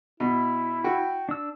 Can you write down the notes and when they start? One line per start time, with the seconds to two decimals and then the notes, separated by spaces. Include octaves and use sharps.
0.20 B2 E4
0.84 F#4 G5
1.29 D4 E6